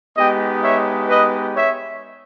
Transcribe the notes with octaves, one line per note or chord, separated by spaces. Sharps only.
G#3 B3 D#4 G4 D#5 G5
C#5 E5
B4 D#5
C#5 E5